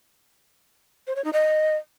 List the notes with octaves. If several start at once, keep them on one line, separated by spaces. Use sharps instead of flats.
C5
C#5
D#4
D#5